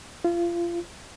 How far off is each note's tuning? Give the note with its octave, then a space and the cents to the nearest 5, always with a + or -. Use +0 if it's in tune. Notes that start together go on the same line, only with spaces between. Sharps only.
F4 -30